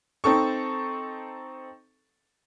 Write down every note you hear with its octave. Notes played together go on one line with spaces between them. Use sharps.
C4 D#4 A4 C#6